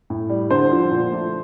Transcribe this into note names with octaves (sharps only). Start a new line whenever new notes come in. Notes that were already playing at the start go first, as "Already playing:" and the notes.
A2
G3
D3 C5
F3
A#2
A3